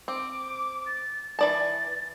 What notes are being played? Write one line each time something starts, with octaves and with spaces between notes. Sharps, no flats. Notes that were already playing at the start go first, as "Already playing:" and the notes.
C4 D6
A6
E3 D5 A5 A6